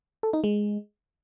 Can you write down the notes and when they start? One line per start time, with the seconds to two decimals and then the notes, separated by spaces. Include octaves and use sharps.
0.23 A4
0.33 D#4
0.44 G#3